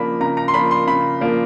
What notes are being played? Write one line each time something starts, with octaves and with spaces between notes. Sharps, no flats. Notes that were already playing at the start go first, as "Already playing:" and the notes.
Already playing: C#3 F3 A#3 D4 B5
C#3 A#5
A#5
C6
F3 A#3 D4 B5
C6
C#3 B5
F3 A#3 D4